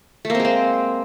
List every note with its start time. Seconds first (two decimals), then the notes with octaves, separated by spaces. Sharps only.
0.25 A3
0.30 A#3
0.35 C4
0.40 G#3
0.45 C4